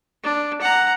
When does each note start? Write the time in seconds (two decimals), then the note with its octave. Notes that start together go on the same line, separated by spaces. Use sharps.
0.23 D4
0.61 F#5 A#5